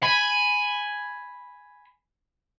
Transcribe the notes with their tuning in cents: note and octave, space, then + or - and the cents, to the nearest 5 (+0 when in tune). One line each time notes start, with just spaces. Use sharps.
G#5 +0 B5 +0